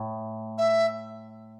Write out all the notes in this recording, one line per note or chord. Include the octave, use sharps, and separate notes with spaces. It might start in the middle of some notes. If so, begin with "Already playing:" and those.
Already playing: A2
E5